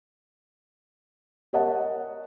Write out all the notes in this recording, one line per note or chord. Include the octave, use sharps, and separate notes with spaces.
G4 A#4 C#5 D#5 F#5 A5